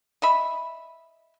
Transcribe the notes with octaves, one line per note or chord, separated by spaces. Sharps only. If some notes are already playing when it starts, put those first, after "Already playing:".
D#5 E5 B5